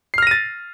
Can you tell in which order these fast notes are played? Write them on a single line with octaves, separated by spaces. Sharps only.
C7 F6 A#6 D#7 A6